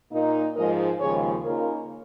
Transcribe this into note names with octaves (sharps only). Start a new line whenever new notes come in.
A#2 A#3 D#4
G#2 F3 G#3 A#4 D#5
D#2 C#3 F3 G#3 G#4 C#5
C#3 A#3 D#4 F4 A#4